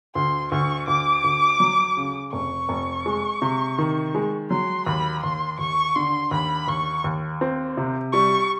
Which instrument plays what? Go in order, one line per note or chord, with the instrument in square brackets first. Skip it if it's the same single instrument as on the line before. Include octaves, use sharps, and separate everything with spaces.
[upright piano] D2 [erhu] C6
[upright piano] D2 [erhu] C#6
[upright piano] D2 [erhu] D6
[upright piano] D2
F#3
C#3
[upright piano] F1 [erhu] C#6
[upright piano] F1
G#3
C3
D#3
G#3
[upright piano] F#3 [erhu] C6
[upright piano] D#2 [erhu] B5
[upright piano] D#2 [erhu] C6
[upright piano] D#2 [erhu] C#6
[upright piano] D3 [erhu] C6
[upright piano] D#2 [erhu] B5
[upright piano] D#2 [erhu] C#6
[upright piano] D#2
C4
C3
[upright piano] G3 [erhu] C#6